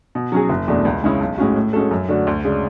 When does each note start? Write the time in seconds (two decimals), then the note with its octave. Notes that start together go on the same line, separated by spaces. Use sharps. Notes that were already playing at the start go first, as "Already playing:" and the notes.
0.15 B2
0.32 F#3 C#4 G#4
0.49 F#1
0.68 E2 B2 A3 D4
0.85 C#2
1.04 C#3 G#3 C#4 E4
1.21 B1
1.38 A2 G#3 C#4 F#4
1.56 A2
1.73 G#3 C#4 F#4 A4
1.91 F#2
2.08 D3 A3 D4 F#4
2.27 D2
2.44 C#3 G#3 D4